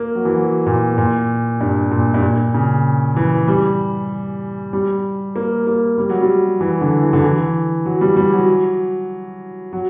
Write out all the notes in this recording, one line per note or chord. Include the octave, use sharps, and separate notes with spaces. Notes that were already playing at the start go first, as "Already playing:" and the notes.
Already playing: A#3
F#3
E3
F#3
A#2
A#2
G2
A#2
G2
A#2
C#3
E3
G3
G3
A#3
A#3
G3
F#3
G3
E3
D3
E3
D3
E3
F#3
G3
G3
F#3
F#3